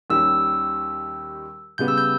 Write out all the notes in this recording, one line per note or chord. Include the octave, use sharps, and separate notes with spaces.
D#2 D#3 G3 C#4 G4 E6
C#3 G3 B3 G6
E6
G6